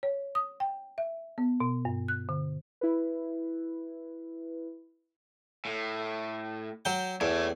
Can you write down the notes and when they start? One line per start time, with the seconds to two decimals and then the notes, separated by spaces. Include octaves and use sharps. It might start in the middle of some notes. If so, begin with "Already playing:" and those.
0.03 C#5
0.35 D#6
0.60 G5
0.98 E5
1.38 B3
1.60 B2
1.85 G2
2.08 F#6
2.29 D3
2.81 E4 B4
5.65 A2
6.85 F#3 G5
7.21 E2 A3 C#5